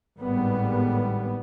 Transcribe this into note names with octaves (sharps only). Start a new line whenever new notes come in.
G#1 A2 G3 B3